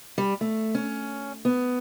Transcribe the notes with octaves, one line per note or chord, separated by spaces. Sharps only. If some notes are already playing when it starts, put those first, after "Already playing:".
G3
A3
C#4
B3